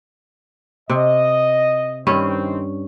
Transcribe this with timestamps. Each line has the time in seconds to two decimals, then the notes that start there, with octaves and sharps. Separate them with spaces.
0.90 C3 D#5
2.07 G2 D#3 C4 C#4